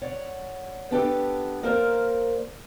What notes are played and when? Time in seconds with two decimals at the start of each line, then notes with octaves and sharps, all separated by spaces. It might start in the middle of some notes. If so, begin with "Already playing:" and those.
0.02 C#5 D5 F#5
0.91 B3 D4 G4 A4
1.63 A#3 A#4 C5 D5